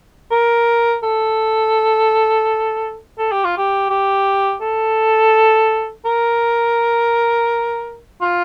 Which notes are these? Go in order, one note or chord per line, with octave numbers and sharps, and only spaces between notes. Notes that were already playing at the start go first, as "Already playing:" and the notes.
A#4
A4
A4
G4
F4
G4
G4
A4
A#4
F4